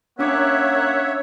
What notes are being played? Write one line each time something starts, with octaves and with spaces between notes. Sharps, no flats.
A#3 C#4 D4 C#5 E5 F#5 D6